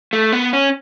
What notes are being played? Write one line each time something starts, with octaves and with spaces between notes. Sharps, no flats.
A3
B3
C#4